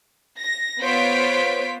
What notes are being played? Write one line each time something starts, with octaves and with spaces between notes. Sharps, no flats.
A#6
B3 F4 C5 C#5 B6 D7